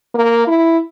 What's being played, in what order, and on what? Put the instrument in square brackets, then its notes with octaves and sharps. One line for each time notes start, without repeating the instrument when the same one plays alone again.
[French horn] A#3
E4